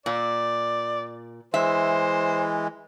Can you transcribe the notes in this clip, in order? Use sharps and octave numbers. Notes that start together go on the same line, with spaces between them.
A#2 D5
E3 G#3 C5 E5